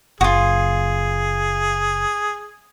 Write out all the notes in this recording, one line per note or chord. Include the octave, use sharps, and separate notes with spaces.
F#1 F4 F#4 G#4